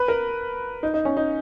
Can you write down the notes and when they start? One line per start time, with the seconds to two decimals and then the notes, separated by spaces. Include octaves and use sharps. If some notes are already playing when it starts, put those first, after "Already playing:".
Already playing: B4
0.08 A#4
0.83 D#4
0.94 D#4
1.05 C#4
1.17 D#4